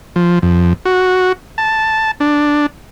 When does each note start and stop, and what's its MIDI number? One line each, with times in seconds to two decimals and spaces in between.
0.16 0.39 53
0.42 0.73 41
0.85 1.32 66
1.58 2.11 81
2.20 2.66 62